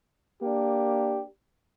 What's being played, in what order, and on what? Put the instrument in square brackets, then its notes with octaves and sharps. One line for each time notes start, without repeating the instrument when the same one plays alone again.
[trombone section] A#3 D4 G4